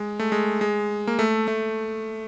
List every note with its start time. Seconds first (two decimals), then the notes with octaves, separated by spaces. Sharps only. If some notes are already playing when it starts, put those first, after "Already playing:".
Already playing: G#3
0.20 A3
0.32 G#3
0.61 G#3
1.07 A#3
1.19 A3
1.48 A3